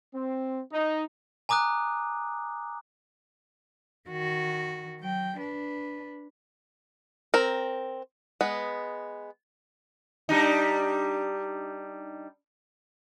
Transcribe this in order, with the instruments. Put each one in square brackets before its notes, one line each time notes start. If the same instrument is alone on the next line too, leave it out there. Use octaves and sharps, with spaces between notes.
[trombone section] C4
D#4
[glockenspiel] G#5 A#5 D6 D#6 F#6
[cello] D#3 F#4
F#3 G5
D4 B4
[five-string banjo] C4 A#4
G#3 B3
[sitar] G3 D4 D#4